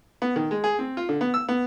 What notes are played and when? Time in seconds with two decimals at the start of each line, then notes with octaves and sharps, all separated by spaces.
0.22 B3
0.36 D#3
0.51 G#3
0.64 G#4
0.79 C4
0.97 F4
1.09 D3
1.21 B3
1.34 E6
1.49 B3